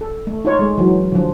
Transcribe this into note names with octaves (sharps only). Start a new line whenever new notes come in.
A4
A3
D#4 F4 C#5
G#3
E3 F#3
D3 F3